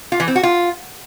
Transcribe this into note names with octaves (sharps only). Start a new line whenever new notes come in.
F4
E3
C4
F#4
F4